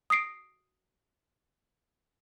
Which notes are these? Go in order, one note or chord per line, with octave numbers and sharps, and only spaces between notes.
D#6 A#6 C7 D7